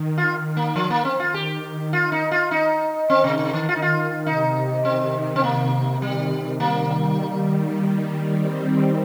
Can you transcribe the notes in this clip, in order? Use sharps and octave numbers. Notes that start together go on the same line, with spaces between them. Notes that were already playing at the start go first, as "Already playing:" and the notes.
Already playing: D#3
F4
A#3
F3
A#3
C4
F4
D#3 G4
F4
D#4
F4
D#4
D#3 C4
C3
C3
D#3
F4
D#4
F4
C3 D#4
D#3 C4
C4
C3 A#3
D#3 G3
D#3 G3 A#3
D#3 G3
D#3 G3
G3 C4